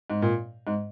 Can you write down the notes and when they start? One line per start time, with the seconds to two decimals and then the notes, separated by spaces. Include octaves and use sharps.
0.10 G#2
0.22 A#2
0.67 G#2